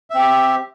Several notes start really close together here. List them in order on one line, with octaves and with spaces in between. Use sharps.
E5 C4 G4